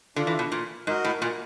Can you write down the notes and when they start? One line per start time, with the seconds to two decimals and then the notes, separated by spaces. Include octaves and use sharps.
0.16 D3 D4 F4 A4
0.27 E3
0.39 B2
0.52 A#2
0.87 G#2 F#4 A#4 D#5
1.04 A2
1.22 A#2